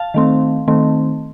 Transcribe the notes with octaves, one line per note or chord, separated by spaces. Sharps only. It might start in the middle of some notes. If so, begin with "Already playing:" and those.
Already playing: F5 A5
D#3 A3 C4
D#3 A3 C4